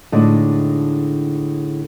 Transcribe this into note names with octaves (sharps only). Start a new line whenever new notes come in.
A2 D3 G#3 D#4 D5